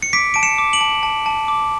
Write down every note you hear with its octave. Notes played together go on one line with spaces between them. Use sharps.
C#7
D6 B6 D7
A5 D7
C#7 E7
D6
D7 F#7
A5
A5
A5
D6